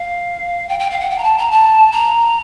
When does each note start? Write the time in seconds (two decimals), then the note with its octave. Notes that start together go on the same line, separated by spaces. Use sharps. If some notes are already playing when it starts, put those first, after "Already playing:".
Already playing: F5
0.69 G5
0.80 G5
0.91 F5
1.00 F#5
1.10 G5
1.18 A#5
1.24 A5
1.38 A#5
1.51 A5
1.92 A#5